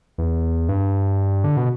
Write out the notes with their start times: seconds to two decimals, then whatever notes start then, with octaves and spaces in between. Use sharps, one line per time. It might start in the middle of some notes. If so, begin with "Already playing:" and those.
0.18 E2
0.69 G2
1.44 D3
1.57 B2